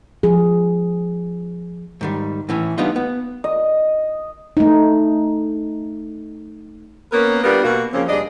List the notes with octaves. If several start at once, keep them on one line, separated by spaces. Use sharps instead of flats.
F3 G#4
G#2 D#3 G3
A2 E3 C#4
G3 B3 D4 D#4 F4
B3
D#5
A3 D#4
A#3 B3 C#4 A#4 B4
G3 B3 D4 F4 A#4
B2 A#3 F#4
C#3 F3 A#3 C4 C#4
G2 D4 G#4 D#5